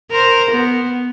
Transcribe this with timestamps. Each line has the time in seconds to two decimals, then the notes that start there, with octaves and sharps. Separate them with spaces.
0.11 A#4 C5
0.51 B3